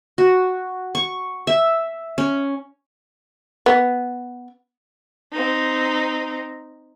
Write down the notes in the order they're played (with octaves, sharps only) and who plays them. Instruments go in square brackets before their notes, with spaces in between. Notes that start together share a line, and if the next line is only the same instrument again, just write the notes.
[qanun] F#4
C#6
E5
C#4
[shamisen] B3
[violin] C4 D#4